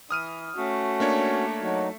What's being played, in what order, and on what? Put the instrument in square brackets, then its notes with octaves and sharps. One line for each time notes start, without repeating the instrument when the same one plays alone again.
[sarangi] E3 [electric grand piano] D#6 F6 D#7
[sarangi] A3 [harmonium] C#4 F#4
[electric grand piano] A#3 D4 C#5
[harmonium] F#3 D#4 F#4